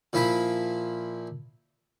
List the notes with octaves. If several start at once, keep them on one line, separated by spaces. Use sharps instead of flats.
A#2 F3 E4 B5